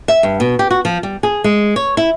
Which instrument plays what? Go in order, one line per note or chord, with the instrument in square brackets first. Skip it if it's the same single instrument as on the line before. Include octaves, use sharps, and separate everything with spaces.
[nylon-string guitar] E5
G2
B2
G4
F#4
F3
G3
G#4
G#3
C#5
E4